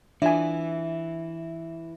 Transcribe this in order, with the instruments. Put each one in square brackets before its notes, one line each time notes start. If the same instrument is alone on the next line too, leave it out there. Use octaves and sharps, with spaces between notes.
[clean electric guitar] E3 E4 [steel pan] D4 F4 G#5 [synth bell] E5